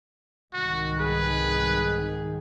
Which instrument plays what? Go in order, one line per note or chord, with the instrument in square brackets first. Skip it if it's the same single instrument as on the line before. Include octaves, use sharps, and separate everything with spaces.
[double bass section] C2 G#2 D#3 [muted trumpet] F#4
[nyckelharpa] G#4 [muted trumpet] B4